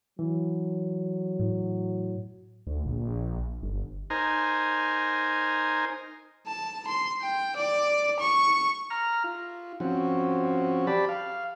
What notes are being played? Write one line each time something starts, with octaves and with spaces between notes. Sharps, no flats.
E3 F#3
A2
D2
A#1
G1
D#4 A#4 C5 G#5
A5
C6
G5
D5
C#6
A#5 F6
F4
F3 C4 C#4 F#4
G4 D5 A5 B5
F5